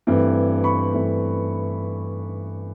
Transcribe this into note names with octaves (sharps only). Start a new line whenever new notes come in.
G2 E3 A3 C4
B5 C#6
G2 E3 A3 C4